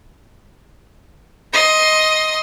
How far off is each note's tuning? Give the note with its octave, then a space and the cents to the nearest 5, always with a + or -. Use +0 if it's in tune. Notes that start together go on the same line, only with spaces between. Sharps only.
D#5 +10 C6 +15